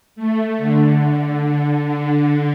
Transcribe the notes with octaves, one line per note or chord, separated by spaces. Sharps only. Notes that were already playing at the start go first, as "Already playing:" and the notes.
A3
D3
D3
D3